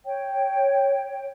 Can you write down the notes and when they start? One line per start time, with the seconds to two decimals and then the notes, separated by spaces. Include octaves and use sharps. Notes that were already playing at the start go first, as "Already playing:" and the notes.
0.05 C#5 G5